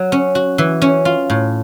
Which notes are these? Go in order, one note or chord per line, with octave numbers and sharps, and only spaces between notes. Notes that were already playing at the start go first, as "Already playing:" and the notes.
Already playing: F#3
C#4
F#4
E3
C#4
F4
A2